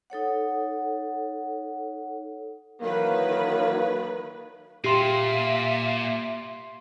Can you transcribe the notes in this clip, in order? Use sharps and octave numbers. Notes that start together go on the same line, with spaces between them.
D#4 A4 C#5 F#5
D#3 E3 F#3 A#3 B4
A#2 G4 E5 F5 C6 D6 C7